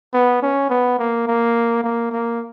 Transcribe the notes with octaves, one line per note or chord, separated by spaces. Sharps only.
B3
C#4
B3
A#3
A#3
A#3
A#3